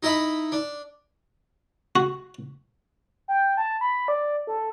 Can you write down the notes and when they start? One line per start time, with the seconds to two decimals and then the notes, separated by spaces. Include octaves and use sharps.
0.03 D#4 E4 D#5 E5 B5
0.52 D4
1.96 F#4
3.28 G5
3.57 A5
3.81 B5
4.08 D5
4.47 A4